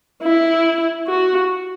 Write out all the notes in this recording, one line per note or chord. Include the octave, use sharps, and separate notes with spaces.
E4
F#4